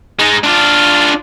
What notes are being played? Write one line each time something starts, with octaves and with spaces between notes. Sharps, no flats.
G#3 D#4
D4 F4